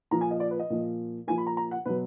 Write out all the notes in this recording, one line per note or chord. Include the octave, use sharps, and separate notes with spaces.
A#2 F3 A#5
G#5
D#5
D5
B4
D#5
A#2 F3
A#2 F3 G#5
B5
A#5
A#5
F#5
B2 F#3 B4